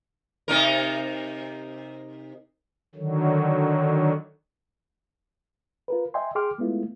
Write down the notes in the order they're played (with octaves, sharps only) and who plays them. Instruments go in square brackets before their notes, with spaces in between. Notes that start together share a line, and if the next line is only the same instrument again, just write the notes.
[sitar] C3 D#4 A#4
[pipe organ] D3 D#3 F#3
[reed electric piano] F4 A#4 B4
D#5 E5 G5 G#5 C6
G#4 G5 C6 D6 F6
G#3 A3 B3 E4 F4